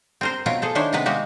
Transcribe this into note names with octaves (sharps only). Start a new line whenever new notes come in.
C4 A#4 C5
B2 C4 F4 A#4 C#5
G#4 A4 C5
D#3 D4 E4 C5 C#5
C3 D#3 G#3 B3 B4
G#3 A#3 F#4 G4